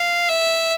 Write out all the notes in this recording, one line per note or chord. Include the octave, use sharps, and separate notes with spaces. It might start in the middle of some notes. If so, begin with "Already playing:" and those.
Already playing: F5
E5